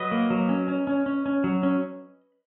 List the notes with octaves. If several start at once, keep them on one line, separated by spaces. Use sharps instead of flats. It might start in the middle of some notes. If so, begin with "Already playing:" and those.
Already playing: F#3 B4 D#5
A#3
F#3
C#4
C#4
C#4
C#4
C#4
F#3
C#4